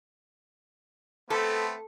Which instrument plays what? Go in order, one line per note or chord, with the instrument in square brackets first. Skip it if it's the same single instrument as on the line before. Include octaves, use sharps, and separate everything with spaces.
[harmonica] A3 B3 C4 [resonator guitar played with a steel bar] A4